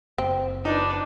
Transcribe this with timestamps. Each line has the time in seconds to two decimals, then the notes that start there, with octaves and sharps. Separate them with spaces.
0.18 F#1 C4
0.65 D4 D#4 B4